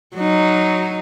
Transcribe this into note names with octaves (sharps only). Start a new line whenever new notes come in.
F#3 D#4